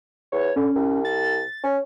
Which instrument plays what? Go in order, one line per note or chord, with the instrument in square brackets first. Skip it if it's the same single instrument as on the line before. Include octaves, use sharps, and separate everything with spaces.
[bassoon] E2 [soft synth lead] C#5
[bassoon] D3 [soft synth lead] C#4
[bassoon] C2
[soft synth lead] A6
[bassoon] C#4